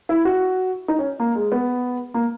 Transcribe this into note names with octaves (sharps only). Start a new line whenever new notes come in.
E4
F#4
D#4
C#4
A#3
G#3
B3
A#3